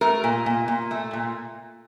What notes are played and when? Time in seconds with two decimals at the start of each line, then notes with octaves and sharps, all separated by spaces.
0.01 A3 A#4
0.24 A#2
0.46 A#2
0.68 A#2
0.91 A3
1.13 A#2